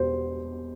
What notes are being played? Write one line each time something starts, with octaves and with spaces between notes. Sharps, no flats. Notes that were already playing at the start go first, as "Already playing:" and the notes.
Already playing: E1 E2 B2 G3 B3 C5